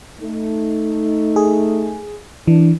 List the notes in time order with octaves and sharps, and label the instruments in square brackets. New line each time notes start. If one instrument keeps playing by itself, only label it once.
[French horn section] A3 D#4
[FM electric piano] G#4
[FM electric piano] E3 [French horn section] D4